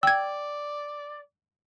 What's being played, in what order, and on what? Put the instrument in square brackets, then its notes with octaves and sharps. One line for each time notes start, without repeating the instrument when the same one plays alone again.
[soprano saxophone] D5 [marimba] G5 [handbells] E6 G#6